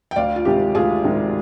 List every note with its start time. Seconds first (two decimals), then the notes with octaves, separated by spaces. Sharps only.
0.11 G5
0.16 D2 D5 F5
0.36 F4
0.45 C3 D#3 G#3 G4
0.75 D2 F4 G#4
1.05 C3 D#3 G#3